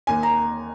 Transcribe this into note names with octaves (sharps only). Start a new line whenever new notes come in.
D#2 G#5
A#5